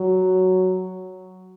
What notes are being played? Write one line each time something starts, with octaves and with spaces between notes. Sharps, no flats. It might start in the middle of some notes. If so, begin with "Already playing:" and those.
Already playing: F#3